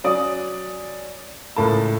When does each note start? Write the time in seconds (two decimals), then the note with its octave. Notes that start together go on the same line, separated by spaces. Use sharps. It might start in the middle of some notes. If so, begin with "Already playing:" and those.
0.04 F#3 C#4 D5 D#6
1.56 C#2 A2 A#4 A5